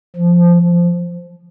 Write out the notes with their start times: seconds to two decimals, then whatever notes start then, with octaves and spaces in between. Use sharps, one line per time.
0.16 F3